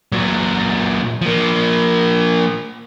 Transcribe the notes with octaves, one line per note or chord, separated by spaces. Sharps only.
A#2 F#3
F3 A#3